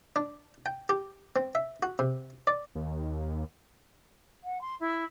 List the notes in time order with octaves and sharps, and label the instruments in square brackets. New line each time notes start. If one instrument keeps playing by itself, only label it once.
[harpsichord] D4
G5
G4
C4
E5
F#4
C3
D5
[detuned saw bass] D#2
[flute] F#5
C6
E4